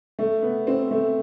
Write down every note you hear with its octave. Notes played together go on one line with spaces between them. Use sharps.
A3
B3
C4
A3